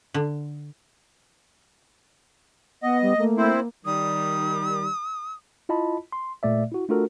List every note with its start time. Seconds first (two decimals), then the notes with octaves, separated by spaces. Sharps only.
0.14 D3
2.83 B3 D#5 F#5
3.02 G3
3.17 A3 A#3
3.38 C4 E4 C5
3.85 D#3 G3 D#6
5.69 E4 F4 D#5 A5 B5
6.12 C6
6.43 A#2 A3 D5 E5
6.72 E4 F#4
6.89 A3 D4 F4 F#4 A4 A#4